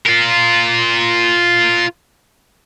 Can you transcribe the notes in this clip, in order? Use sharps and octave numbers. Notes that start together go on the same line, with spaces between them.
F4 A#4